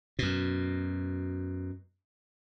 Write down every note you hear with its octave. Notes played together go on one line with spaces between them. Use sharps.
F#2 B2